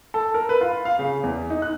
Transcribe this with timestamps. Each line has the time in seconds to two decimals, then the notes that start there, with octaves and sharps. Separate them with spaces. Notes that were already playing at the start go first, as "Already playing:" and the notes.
0.14 A4
0.34 A#4
0.49 B4
0.61 F4
0.85 F5
0.99 C#3
1.23 E2
1.50 D#4
1.62 F#6